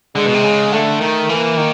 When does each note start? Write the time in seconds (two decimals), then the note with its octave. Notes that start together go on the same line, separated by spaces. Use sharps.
0.15 D3 G#3
0.26 B2
0.34 C3
0.44 C#3
0.72 D3 A3
1.01 D#3
1.29 E3 A#3
1.57 D#3